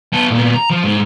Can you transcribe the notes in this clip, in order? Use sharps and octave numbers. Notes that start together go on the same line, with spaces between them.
B3 A4
A#2 B3
A#5
F3
G#2